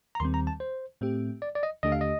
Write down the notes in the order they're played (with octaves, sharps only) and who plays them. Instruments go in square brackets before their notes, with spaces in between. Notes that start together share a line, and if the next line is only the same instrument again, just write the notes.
[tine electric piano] A#5
[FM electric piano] D#2 D#3 G3 C4 [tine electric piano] C6
[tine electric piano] A#5
A5
C5
[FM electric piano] A2 A3 C4 G4
[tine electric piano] D5
D5
D#5
[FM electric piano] D#2 D3 A3 D4 G4 [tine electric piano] D#5
[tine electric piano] F5
D#5